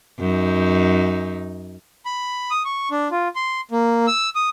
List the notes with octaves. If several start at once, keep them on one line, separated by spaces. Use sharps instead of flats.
F#2 D#4
B5
D#6
C#6
D4
F4
C6
A#3
E6
D#6